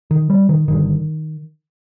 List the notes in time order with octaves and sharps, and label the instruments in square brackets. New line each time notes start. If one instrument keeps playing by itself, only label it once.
[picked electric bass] D#3
G3
D#3
G1 G2 D3 D#3